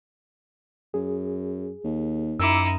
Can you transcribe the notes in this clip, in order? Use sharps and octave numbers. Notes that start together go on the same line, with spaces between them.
F#2 G#4
D#2
F#2 D#4 E4 D6 E6